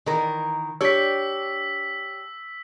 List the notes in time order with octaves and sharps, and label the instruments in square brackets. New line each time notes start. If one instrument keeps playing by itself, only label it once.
[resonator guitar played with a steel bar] D#3 E3 A#4
[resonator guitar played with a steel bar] D4 G4 C#5 [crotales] E6 B6